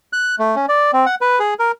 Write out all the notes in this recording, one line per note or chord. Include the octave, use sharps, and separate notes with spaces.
F#6
A3
C#4
D5
C4
F#5
B4
G#4
A#4